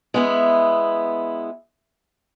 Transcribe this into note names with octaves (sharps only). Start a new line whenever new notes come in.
G#3 B3 E4